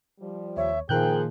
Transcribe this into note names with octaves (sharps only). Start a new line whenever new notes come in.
F3 G3
D#2 C#5 E5
A#2 D#3 F3 G#4 A#4 G5 F#6 G6